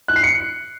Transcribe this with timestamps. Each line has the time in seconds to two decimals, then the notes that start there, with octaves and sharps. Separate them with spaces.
0.08 F#6
0.16 C7
0.23 C#7